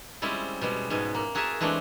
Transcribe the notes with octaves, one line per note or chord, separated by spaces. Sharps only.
G3 G#3 C4 C#4 E4 F4
B2 G3 G#3
G#2 B2 G#5
A#3
F#4 G#4 A#4 E5 G#5 A5
E3 G#3 A3 C4 D4